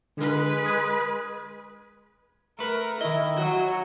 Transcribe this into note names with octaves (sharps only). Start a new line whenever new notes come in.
D3 G#3 B4
D#6 G#6
A3 A#4 B4
D#3 E4 D#5
F#3 F#4